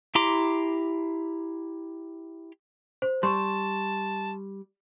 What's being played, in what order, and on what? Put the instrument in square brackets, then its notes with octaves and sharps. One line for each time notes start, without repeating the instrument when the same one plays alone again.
[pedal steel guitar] E4 G4 A#5 C6 D6
[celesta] C5
[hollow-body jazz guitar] G3 [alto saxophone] A5 [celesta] C6 C#6 E7